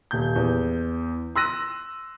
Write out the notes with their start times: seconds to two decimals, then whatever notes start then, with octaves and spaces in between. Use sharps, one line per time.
0.11 D#1 G6
0.36 E2
1.36 C6 E6 F#6 A#6 D#7